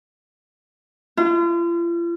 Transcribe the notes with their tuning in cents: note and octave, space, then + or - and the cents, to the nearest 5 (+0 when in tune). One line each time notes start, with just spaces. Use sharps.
F4 -40